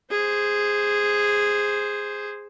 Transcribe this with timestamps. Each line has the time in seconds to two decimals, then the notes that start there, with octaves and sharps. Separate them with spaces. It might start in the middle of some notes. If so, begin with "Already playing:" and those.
0.11 G#4 C5